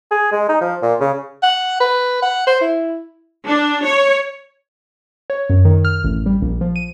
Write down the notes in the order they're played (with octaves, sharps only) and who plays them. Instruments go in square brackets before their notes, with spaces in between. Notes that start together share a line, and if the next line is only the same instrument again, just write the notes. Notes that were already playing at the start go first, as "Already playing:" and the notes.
[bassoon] G#4
G#3
D#4
F3
A#2
C#3
[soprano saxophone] F#5
B4
F#5
C5
E4
[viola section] D4
C#5
[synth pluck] C#5
F#2
D#3
F6
A1
G3
A#1
F3
D#7